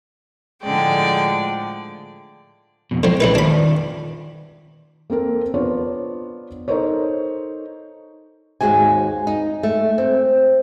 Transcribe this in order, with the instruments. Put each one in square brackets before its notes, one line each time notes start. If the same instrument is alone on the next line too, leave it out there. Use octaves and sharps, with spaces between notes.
[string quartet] A2 D3 F3 G#3 D5 G5
[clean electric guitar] F2 B2
[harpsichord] D3 F3 [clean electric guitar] G#3 C4
[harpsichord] C#3 D#4 B4 [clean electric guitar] G#3 C4 B5
[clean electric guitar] D#3 F4 D5 [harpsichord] D4 B5
[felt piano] A#3 C4 A4 A#4
B3 D4 F4 C5 C#5
D#4 A4 A#4 C5 C#5
[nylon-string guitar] D#2 G#2 G#3 F#4 G#5
D#4
A3
C4